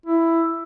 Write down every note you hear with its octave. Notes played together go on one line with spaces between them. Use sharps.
E4